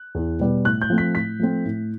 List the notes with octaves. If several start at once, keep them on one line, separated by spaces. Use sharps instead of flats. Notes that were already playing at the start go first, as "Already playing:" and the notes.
Already playing: F#6
E2
B2 G3 B3
A2 F#6
G6
F3 A3 C4
B6
A2 B6
F3 A3 C4
A2